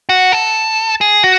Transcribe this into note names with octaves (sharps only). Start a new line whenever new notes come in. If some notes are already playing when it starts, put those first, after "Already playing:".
F#4
A4
G#4
F#4